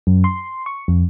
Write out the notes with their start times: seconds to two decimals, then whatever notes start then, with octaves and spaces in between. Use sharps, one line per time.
0.07 F#2
0.24 C6
0.66 C#6
0.88 F2